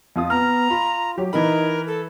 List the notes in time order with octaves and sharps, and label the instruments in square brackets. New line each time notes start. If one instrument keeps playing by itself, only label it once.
[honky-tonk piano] F2 F4 D#6
[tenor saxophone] B3 [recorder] A#5 [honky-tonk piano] F6
[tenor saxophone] F4 [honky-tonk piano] B5
[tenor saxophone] F#3 [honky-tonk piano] G4
[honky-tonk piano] E3 B5 [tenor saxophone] D#4 [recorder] A#4
[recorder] A4